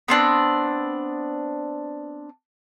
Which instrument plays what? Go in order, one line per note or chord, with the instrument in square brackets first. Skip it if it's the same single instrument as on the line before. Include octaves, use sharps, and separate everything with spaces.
[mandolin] B3 C4 D4